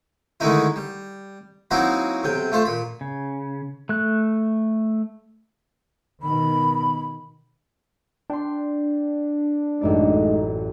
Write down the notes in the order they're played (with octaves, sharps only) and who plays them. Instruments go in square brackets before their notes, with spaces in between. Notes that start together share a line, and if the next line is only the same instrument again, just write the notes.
[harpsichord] D3 D#3 G#3 A3 D#4 E4
G3
F#3 A#3 C4 D#4 E4 F#4
B1 C3 G5
A3 F4 C5 A5
A#2 B5
[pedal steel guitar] C#3
A3 F#6
[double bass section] B2 D#3 [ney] B5
[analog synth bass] D4 [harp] G5 C6
[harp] A1 F#2 D5 [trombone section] G#3 A3 D#4